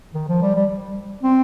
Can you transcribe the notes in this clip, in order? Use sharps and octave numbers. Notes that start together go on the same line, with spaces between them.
D#3
F3
G3
G3
C4